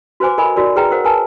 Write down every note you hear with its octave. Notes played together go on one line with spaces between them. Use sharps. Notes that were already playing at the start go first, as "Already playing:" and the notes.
F#4 B4 C5 G#5 D6
A4 A#4 D#5 G#5 B5
D#4 F#4 A#4 D5
G#4 B4 G5 A#5
A#4 C5 F#5
A#4 B4 G#5 A5